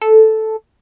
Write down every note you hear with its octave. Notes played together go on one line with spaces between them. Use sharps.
A4